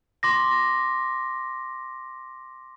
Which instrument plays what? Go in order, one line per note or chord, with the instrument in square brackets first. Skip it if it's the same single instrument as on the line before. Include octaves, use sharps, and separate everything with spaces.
[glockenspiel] C6 D6 A#6